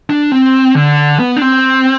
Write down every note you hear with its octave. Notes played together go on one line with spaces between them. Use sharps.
D4
C4
D3
B3
D4
C4